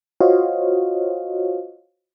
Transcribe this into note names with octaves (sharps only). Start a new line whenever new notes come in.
F4 F#4 C5 C#5 D#5 F5